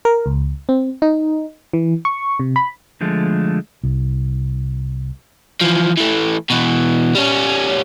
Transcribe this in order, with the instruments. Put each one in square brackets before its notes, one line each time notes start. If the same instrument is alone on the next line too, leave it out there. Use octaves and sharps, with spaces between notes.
[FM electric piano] A#4
C#2
C4
D#4
E3
C#6
C3
B5
[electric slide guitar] D3 F3 G#3 A3
[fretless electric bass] C2
[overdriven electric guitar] E3 F3
E3 A3
B2 E3
G3 C#4